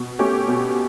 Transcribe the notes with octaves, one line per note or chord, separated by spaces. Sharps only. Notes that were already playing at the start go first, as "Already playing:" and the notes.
Already playing: B2
A3 C#4 G4
B2